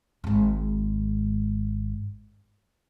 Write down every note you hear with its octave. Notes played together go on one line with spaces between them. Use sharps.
G#1 G#2